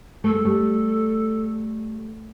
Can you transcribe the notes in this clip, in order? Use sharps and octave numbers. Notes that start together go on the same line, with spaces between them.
A3 A4
G#3
G3 A3